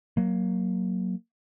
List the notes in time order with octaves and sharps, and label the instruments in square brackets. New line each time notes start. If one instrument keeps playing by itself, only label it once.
[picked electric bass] F#3 A#3